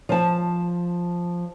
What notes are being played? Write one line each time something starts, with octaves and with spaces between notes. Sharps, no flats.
F3 A5